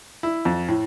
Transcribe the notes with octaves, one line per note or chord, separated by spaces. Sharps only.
E4
F2
A2